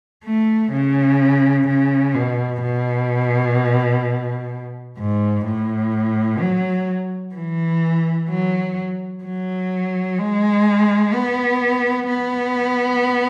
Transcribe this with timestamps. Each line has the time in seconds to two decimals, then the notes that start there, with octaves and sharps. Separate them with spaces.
0.25 A3
0.73 C#3
1.68 C#3
2.14 B2
2.62 B2
4.98 G#2
5.46 A2
6.40 F#3
7.35 E3
8.29 F#3
9.24 F#3
10.19 G#3
11.14 B3
12.08 B3